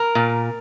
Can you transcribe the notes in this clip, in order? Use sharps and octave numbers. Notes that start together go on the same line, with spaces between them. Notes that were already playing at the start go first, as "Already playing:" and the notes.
Already playing: A#4
A#2